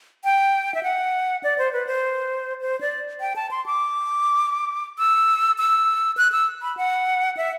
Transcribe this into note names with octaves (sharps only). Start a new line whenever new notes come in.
G5
E5
F#5
D5
C5
B4
C5
C5
D5
G5
A5
C6
D6
E6
E6
F#6
E6
B5
F#5
E5